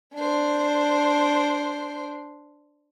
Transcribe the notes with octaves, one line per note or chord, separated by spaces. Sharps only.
D4 C5